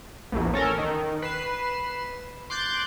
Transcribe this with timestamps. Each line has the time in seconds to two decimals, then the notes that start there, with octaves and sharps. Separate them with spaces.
0.32 A#1 E2
0.54 C#4 A4 A#4
0.78 D#3
1.22 B4 C7 E7
2.50 C6 D6 F#6 G6 A6